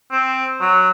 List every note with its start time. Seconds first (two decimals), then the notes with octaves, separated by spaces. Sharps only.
0.12 C4
0.60 F#3